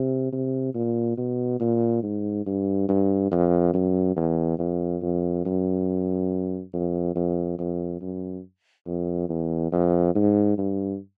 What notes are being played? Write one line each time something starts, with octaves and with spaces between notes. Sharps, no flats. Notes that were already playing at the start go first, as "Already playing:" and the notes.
Already playing: C3
C3
A#2
B2
A#2
G#2
G2
G2
F2
F#2
E2
F2
F2
F#2
F2
F2
F2
F#2
F2
E2
F2
G#2
G2